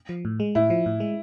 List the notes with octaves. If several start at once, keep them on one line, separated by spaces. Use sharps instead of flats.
F3
A2
G#3
A2 E4
F3
A2
G#3